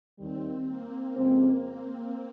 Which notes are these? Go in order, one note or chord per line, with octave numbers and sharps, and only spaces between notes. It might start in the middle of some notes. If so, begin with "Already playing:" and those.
D#2 D#3 G3 C4
A#3
F2 C#3 G#3 C4
C4